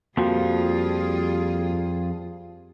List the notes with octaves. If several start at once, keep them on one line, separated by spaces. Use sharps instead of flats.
F2 F3 G3 A#3 F4 F#4 G#4